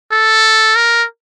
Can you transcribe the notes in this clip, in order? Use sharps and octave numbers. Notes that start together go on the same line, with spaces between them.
A4
A#4